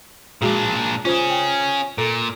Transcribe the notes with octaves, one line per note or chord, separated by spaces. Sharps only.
A#2 G#3 D4 F#4 G#4
C#4 F4 G#4 C5
G5
A#2 A4